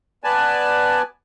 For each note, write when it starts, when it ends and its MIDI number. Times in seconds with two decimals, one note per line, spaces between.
0.24 1.02 59
0.24 1.02 71
0.24 1.02 74
0.24 1.02 80
0.24 1.02 81